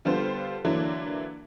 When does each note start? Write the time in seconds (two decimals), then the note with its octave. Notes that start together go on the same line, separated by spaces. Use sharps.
0.05 D3 G3 B3 F4 A4 C5
0.65 D3 E3 F#3 A#3 D4 E4